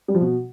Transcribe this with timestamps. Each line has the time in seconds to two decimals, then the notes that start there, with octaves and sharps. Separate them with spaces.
0.08 G3
0.15 F3
0.21 B2